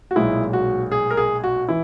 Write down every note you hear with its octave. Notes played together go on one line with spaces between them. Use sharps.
F#4
B1 A#2 G#3 E4
F#4
G#4
A#4
G#4
F#4
E3 E4